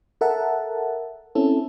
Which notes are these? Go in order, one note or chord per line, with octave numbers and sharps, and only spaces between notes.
A4 A#4 E5 F#5 A5
C4 C#4 E4 A4